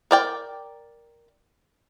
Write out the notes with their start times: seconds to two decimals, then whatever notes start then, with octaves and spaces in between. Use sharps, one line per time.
0.11 A#4 D5 G5